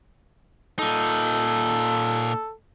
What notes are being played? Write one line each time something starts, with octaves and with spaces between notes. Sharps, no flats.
A#2 D#4 A4